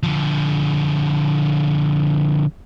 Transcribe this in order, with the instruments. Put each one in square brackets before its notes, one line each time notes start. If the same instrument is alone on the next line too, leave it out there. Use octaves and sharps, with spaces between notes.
[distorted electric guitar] D3 F3